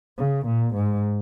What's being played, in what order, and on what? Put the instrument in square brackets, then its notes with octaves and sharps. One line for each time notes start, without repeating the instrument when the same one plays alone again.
[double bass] C#3
A#2
G#2